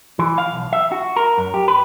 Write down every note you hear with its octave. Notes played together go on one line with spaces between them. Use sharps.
E3
F5
B1
E5
F#4
A#4
F#2
G4
B4